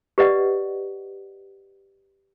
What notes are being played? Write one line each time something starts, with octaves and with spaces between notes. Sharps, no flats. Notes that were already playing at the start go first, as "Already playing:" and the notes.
G4 B4 D5 D#5 F#5